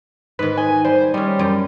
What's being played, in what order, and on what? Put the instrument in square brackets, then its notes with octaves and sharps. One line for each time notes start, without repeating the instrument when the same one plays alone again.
[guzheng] G#2 D#3 [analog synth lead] B4
[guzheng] D#5 [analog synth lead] G#5
[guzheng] G3 [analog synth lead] C5
[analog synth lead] G3 [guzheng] G#3 C#4
[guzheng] F#2 G4 A#5